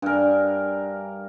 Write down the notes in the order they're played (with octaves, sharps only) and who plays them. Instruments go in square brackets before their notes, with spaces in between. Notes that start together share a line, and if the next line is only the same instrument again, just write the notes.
[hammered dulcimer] G2 A#4 [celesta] D4 G#5